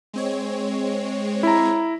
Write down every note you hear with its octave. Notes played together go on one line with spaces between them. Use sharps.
G#3 C4 C#5
E4 A#5